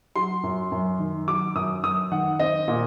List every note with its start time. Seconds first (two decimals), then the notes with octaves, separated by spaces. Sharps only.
0.16 F#3 C6
0.43 F#2
0.72 F#2
0.99 D#3
1.28 F#3 D6
1.55 F#2 D#6
1.83 F#2 D#6
2.12 D#3 F#5
2.40 C4 D#5
2.68 A#2